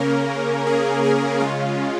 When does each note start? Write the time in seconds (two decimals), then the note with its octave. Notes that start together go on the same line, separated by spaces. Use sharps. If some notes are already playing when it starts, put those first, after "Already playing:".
Already playing: C#3 A#3 C#4 A#4
0.66 G#4
1.03 G#4
1.40 C#3 G#3 C#4 F4